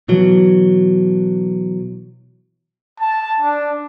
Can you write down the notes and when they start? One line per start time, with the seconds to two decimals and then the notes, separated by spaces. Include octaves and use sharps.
0.08 B2 E3 F#3
2.99 A5
3.41 D4